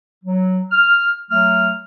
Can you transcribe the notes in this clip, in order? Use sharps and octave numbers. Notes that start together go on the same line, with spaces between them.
F#3
F6
F#3 A3 F6